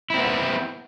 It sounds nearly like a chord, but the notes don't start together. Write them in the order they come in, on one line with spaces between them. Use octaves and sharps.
E4 C4 B3